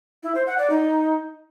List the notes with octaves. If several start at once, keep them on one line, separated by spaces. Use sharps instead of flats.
E4
C5
F#5
D5
D#4